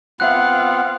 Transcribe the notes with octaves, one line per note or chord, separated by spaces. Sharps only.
B3 C4 F4 F5 F#5 F#6